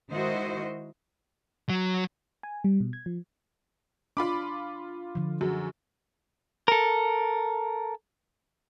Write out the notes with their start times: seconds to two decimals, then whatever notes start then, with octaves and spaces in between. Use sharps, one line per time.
0.10 D#3 G#3 E4 F#4 C5 D#5
1.69 F#3
2.43 G#5
2.64 G3
2.80 B2
2.93 G#6
3.06 F3
4.17 D4 F4 B5 D6
5.15 D3 F3
5.41 F#2 F#4 G#4
6.68 A4 A#4